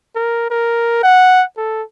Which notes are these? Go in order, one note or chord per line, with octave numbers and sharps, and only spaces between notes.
A#4
A#4
F#5
A4